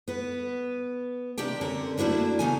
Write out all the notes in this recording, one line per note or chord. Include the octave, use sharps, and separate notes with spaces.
B3 B4
C3 D#3 D4 G4 G5
D3 C4 C#4 A#4
A3 A#3 D4 E4 F#4
C#3 B3 D#4 A#4 G#5